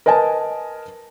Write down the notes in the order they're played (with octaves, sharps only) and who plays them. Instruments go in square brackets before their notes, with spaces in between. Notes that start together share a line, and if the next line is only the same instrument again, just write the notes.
[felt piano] A#4 B4 D#5 G#5 A5